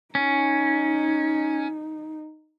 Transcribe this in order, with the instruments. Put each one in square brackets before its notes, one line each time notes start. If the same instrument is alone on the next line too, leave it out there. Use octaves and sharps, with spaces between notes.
[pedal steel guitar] C#4 [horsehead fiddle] D#4